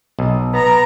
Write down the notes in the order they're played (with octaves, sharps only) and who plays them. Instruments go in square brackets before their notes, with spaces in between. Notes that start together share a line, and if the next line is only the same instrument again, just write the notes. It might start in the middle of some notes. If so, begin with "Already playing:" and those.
[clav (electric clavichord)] B1
[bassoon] B3 [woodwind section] A#5